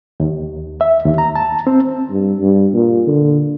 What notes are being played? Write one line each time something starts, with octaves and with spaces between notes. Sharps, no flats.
D#2
E5
D#2
A#5
A5
C4
G2
G2
A#2
D3